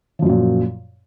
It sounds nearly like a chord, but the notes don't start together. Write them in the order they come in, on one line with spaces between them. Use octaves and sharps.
F3 F#2 F#3 A#2